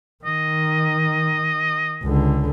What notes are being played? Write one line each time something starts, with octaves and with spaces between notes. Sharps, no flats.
D#3 D#5
C#2 D3